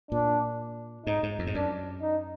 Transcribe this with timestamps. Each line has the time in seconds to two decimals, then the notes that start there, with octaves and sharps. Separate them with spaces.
0.11 A#2 D4
1.06 G#2 D#4
1.23 G#2
1.39 F2
1.47 G#2
1.55 F#2 D4
2.02 D#4